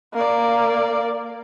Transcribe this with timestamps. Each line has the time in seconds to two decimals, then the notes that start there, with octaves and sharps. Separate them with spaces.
0.14 A#3 D5